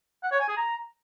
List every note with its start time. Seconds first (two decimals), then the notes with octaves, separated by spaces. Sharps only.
0.23 F#5
0.32 C#5
0.40 G#5
0.49 G#4
0.57 A#5